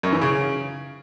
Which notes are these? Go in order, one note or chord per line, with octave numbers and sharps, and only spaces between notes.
F#2
E3
C#3